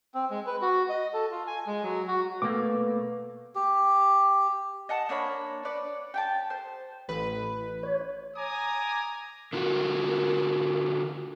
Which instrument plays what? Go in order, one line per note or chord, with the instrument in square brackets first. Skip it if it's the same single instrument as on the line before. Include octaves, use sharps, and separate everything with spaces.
[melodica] C4
G#3
B4
F#4
D#5
A4
F4
G#5
G#3
F#3
F#4
[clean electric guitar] B2 A3 A#3 [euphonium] B4 [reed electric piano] D6
[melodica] G4
[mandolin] D#5 F#5 A5
A#3 D4 C#5 B5
B4 C#5 D5
G4 G5 A5
C5
[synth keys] A1 B4
[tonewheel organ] C#5
[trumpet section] G#5 A#5 D6 D#6
[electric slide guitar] D3 F4 F#4 [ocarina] A#4